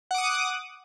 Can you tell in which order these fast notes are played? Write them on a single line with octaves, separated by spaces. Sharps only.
F#5 D6 D#6